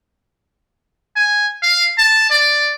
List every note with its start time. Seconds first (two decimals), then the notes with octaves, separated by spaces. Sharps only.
1.16 G#5
1.62 F5
1.98 A5
2.30 D5